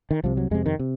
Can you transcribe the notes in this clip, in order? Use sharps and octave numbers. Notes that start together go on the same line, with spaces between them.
D#3
C2 C3 F3
F#3
F2 C3 G#3
D#3
C3